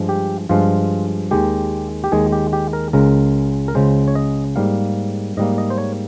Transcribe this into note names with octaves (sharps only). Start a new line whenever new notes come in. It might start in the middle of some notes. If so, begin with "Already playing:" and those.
Already playing: G2 F3 G#3
G4
G2 F3 G#3 F4
D#2 D#3 G#3 G4
G4
D#2 D#3 G#3 G#4
G4
G4
A#4
C#2 C#3 G#3 A#4
A#4
C#2 C#3 G#3 C5
C#5
D#5
G#2 G3 A#3 F5
G#2 G3 A#3 D#5
D#5
C5
C#5